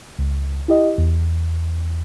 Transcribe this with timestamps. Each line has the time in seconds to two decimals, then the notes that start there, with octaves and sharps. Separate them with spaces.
0.19 C#2
0.68 E4 G4 D#5
0.98 E2